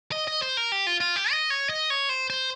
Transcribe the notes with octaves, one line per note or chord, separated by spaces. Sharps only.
D#5
D#5
C5
A#4
G4
F4
F4
G4
D#5
C#5
D#5
C#5
C5
C5